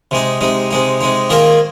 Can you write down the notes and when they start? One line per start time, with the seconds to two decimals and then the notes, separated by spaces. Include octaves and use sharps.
0.11 C3 G#3 D#4
0.41 C3 G#3 D#4
0.71 C3 G#3 D#4
1.01 C3 G#3 D#4
1.30 D#3 A#3 F4 G#4 D#5